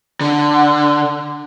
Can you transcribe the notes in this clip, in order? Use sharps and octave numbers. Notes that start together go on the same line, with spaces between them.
D3